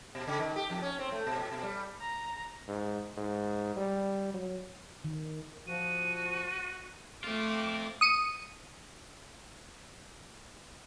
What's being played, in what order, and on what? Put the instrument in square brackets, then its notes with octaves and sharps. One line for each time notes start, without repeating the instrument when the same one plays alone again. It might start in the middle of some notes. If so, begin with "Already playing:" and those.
[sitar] B2
C#3
D#3
G4
F2
C#4
C4
A3
B2
A#2
B2
G3
[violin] A#5
[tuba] G#2
G#2
G3
F#3
[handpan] D#3
[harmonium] F3 [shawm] F#4 [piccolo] D#7
[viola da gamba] A3 [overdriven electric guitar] C4 F4 [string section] D6
[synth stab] D#6 C#7 D#7